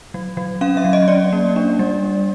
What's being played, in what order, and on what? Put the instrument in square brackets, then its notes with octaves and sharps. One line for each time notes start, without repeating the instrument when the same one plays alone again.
[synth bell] F#3
F#3
C#4 F5
E5
F#3
D#5
C#4 D5
A#3
D4
G3